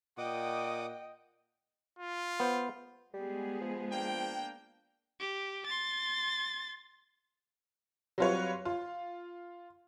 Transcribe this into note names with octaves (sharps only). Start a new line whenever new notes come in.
A#2 D#5 F#5 G5 D6 D#6
F4
B3 C5
G3 G#3 B3 G#4
F3
A#3 D4 G5
G4
C6 A6
F#3 G3 C4 F4 B4 C#5
F4